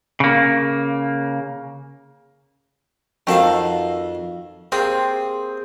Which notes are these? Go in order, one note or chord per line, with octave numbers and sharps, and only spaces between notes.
C#3 A#3
F2 D#3 F#4 A4 F5
C3 A#3 C4 G#4